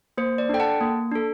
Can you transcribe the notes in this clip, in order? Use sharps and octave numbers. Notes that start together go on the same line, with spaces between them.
A#3 C5
D5
D4 A4 G5
F#5 A5
A#3
D4 A4